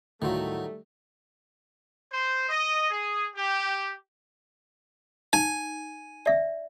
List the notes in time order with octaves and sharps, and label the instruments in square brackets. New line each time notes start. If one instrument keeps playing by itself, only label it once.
[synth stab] D2 F4 F#4 [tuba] A2 [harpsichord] D#3 F#3 [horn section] G3 A3
[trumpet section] C5
D#5
G#4
G4
[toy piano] D#4 [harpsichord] G#5
[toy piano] D5 E5